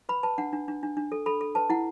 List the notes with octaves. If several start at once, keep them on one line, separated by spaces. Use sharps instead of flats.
B4 B5
B4 A5
D4 F#5
D4
D4
D4
D4
A4
A4 B5
A4
B4 A5
E4 F#5